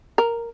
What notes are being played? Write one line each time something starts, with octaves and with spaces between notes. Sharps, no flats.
A#4